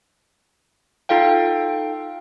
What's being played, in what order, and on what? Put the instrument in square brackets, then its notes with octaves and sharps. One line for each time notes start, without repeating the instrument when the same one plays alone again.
[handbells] D#4 F4 A4 F5 G5